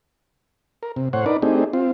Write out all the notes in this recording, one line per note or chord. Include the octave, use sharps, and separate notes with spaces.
A#4
C3
A2 C5 C#5 F#5
D4 D#4 A#4 B4 D5
A3 C4 D4 D#4 G4 G#4
C4 F4